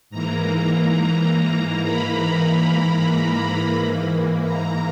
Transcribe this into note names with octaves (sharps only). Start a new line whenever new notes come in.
G#2 E3 A#3 A#5
B5
G#2 E3 A#3
A#5